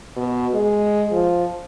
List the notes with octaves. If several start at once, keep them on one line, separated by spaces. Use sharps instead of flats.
B2
G#3
F3